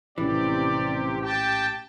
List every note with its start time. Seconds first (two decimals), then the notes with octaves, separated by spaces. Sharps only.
0.18 A#1 A2 C3 E3 C#4 G4 D5
1.22 G4 G5 A5